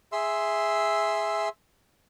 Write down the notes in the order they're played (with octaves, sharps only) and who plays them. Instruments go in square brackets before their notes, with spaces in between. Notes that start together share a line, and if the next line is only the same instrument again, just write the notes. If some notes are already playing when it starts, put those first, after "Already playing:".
[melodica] G#4 E5 C6 E6